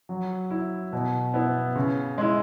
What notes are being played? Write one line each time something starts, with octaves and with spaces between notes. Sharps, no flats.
F#3
E4
B2
B3 E4
C#3
G#3 E4